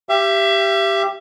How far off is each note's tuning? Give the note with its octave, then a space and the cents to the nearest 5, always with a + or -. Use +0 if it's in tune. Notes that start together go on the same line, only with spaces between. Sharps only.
G4 +0 E5 +35